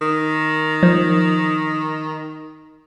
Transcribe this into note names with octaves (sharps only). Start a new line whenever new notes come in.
D#3
F3